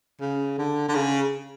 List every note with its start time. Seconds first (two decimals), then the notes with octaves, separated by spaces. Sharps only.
0.21 C#3
0.58 D3
0.89 D3
0.95 C#3